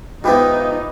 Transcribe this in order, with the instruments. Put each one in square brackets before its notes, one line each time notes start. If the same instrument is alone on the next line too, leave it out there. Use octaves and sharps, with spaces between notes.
[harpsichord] G#2 E3 B3 [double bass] D#4 [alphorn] F4 [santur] G4 B4 E5